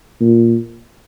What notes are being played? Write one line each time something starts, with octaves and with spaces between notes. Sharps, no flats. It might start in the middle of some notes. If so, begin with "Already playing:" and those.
A#2